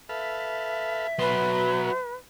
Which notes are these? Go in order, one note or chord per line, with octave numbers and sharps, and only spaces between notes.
A4 B4 E5 F5
B2 F#3 B4 C6